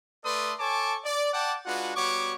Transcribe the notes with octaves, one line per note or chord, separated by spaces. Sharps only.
A3 A4 B4 D5 C6 D#6
A4 C#5 G#5 A5 C#6 D6
D5
D5 F#5 G5 A5 D6
G#3 D4 F4 F#4 B4 F#5
G3 B3 F#4 C#5 C#6 D6